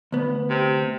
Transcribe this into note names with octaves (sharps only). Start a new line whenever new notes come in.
D2 B3
C3